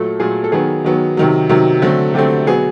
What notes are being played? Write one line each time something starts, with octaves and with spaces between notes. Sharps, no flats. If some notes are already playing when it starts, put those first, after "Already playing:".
Already playing: A#2 F#3 A3 A4
A#2 F#3 A3 G#4
A4
D#3 F#3 B3 G#4
D#3 F#3 B3
C3 D#3 F#3
C3 D#3 F#3
D3 F#3 A3 C4
D3 F#3 A3 C4 G4
B2 F#3 B3 G#4